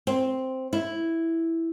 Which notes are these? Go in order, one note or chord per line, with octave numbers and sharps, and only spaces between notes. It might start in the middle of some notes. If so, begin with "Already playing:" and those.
C4
E4